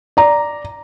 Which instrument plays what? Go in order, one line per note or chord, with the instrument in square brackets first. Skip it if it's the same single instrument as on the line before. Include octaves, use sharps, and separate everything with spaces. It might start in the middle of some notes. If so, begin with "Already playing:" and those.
[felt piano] D5 A#5